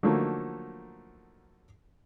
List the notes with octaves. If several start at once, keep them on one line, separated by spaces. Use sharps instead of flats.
D3 F3 F#3 A3 A#3 D#4